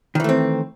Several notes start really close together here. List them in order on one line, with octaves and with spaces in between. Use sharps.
D#3 E3 A3 C4